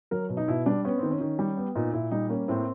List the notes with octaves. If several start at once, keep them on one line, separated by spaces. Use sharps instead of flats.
F#3 A#4
B2
D#4
B2 E4
G3 D4
B3 C#4
D#3 C4
C#4
D#3
G3
B3
A#2 D#4
A#2 E4
G3 D#4
A#3 C#4
A2 C4